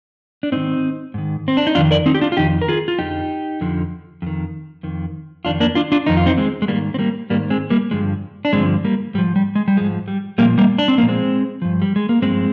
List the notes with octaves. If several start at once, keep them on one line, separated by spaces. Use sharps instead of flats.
D4
G#2 D#3 C4 D#4
G#2 D#3
C4
D4
D#4
F2 D#3 D4 F4
A#4 D5
C4 D#4
G4
D4 F4
F4
F2 D#3 D#4 G4
A#4
F4 G#4
F4
F2 D3 F3 D#4 G4
F2 D3 F3
F2 D#3
F2 D#3
F2 D#3 D4 F4
A#3 D4
D4 F4
D4 F4
F2 D#3 D#4
F4
C4 D#4
G#3 C4
G#3
G#2 D#3 G3 A#3
C4
G3 A#3
G#2 D#3 G3 A#3
G#3 C4
G3 A#3
G2 D3 F3 G#3
D4
G2 D3 F3 G#3 C4
G3 A#3
G#2 F3 G3
G3
G#3
G3
G#2 F3 G#3
G3
A#2 F3 G3 A#3
G3 A#3
D4
C4
A#2 F3 A#3
G#3 C4
G2 F3
G3
G#3
A#3
G2 F3 G#3 C4